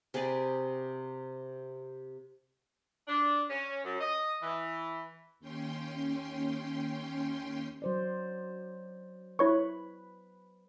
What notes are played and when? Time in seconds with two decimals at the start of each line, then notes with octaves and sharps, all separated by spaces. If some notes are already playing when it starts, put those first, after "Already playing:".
0.14 C3 G#4 B4 D5
3.08 D4
3.49 C#4
3.84 F#2
4.00 D#5
4.42 E3
5.39 D#2 C#4 G5 C6
7.82 F#3 C5 D5
9.39 E4 B4 C#5 C#6